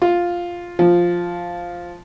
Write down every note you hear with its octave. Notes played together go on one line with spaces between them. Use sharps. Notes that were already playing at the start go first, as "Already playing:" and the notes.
F4
F3